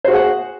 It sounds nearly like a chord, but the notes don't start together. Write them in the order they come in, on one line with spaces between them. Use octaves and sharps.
C5 F#4 G#4 F#5